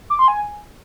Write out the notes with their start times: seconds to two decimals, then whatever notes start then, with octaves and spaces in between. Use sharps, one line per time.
0.10 D6
0.19 C6
0.28 G#5